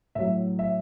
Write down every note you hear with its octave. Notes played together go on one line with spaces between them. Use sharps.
A2 F#3 E5
E5